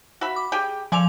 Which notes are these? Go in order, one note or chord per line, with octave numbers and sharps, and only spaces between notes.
F#4 E5 B5
D6
G4 G#4 G5
F3 A4 D5 G#5 D6 F7